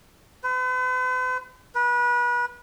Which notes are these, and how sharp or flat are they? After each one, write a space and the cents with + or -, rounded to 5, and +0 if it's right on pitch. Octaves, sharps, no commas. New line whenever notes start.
B4 +45
B4 -30